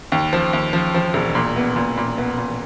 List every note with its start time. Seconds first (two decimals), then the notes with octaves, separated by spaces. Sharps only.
0.12 D#2
0.33 F3
0.53 D#2
0.73 F3
0.94 F3
1.14 E1
1.35 A#2
1.56 B3
1.76 A#2
1.97 A#2
2.18 B3
2.38 A#2